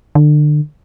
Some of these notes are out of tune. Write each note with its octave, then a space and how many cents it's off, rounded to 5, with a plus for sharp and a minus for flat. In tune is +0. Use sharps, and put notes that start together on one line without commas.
D3 +30